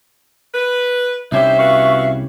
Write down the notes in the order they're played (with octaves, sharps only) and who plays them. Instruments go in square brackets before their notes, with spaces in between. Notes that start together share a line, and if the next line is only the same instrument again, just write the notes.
[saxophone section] B4
[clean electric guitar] C2 C#4 G4 [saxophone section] D#4 C5 [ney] E5
[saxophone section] B3 F#4 F5 [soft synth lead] C#6